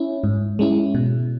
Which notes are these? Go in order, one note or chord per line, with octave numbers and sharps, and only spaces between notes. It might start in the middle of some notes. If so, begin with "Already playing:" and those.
Already playing: C#4 E4
G#2
G#3 C#4 E4
B2